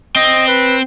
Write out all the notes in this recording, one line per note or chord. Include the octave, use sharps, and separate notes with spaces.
C4 D#5
B4